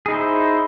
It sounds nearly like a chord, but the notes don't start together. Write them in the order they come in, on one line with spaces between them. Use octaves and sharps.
G#4 D#4 E4 C5